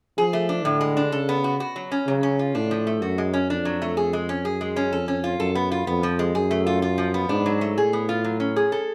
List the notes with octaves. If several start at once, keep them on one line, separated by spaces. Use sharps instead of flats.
F3 G#4
A3
D4
A2 D3
G#3
D4
C#3 A4
B3
F#4
F#4
F#3
C#4
C#3 F#3
C#4
F4
A2 D4
F3
A3
F#2 F#4
G#3
C#4
F2 D4
F#3
A3
G#4
G#3
C#4
F#2 G#4
G#3
C#4
F2 A4
C#4
F4
F#2 A4
B3
F4
F2 B3
F3
G#3
F#2 G#4
A3
F4
F4
F3
B3
G#2 D4
F#3
A3
A2 G#4
B3
F4
F#3
C#4
G#4
A4